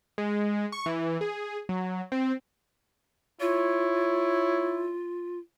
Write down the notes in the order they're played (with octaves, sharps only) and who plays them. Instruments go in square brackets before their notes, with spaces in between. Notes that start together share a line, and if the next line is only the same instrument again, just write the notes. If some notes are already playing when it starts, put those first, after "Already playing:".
[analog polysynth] G#3
C#6
E3
G#4
F#3
C4
[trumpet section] E4 C#5 [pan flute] F4